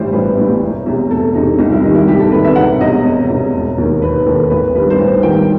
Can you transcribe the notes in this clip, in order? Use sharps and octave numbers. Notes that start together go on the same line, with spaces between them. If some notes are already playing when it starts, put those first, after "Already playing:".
Already playing: A1 A2 E3 G3 C5
A1 B4
A2 E3 G3
E1
E2 C3 E3
E1 A4
E2 C3 E3 D#4
C2 D#4
E4
C3 D#3 G3 D#4
E4
C2 G4
A4
C3 D#3 G3 B4
E5
E1 F#5
E2 C3 D#5
E1
E2 C3
E1
D#2 D#3
E1 B4
D#2 D#3 A4
A1 B4
G2 D#3 G3 B4
C5
A1 B4
G2 D#3 G3 G5